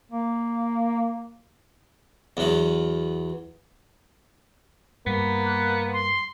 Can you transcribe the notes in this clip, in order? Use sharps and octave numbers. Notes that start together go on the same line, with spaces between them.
A#3
E2 F#3
G2 A#3 B3
F#6
C6